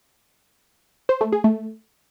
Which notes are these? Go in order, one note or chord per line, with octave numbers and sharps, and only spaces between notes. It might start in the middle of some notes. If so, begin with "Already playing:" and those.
C5
A3
G#4
A3